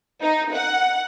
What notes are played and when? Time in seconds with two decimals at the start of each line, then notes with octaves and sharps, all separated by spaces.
0.22 D#4
0.54 F#5